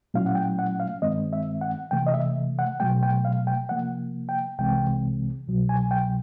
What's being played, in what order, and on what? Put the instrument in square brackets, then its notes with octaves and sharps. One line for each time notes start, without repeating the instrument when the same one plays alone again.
[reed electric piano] A#2 F#3 A3 C#4 E4 F5
F#5
G5
F#5
F5
G2 D#3 G#3 C4 D#5
E5
F#5
C3 E3 A3 G5
D#5
E5
F#5
B2 F#3 A3 G5
G5
F5
G5
C3 F3 A#3 F#5
G5
C2 C3 E3 G#3 C4 G5
C2 B2 F#3
G#5
G5